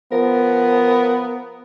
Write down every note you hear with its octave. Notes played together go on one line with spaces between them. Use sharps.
F3 B3 A#4